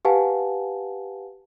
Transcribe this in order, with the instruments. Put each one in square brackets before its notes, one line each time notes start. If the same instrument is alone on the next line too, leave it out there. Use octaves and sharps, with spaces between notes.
[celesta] G4 B4 F5 F#5 G#5 A5